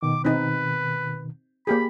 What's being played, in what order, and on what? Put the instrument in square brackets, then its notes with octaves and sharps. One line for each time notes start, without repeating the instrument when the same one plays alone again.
[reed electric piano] B2 D#3 [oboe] D6
[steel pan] C4 D#4 [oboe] B4
[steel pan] A#3 G4 G#4 [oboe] B5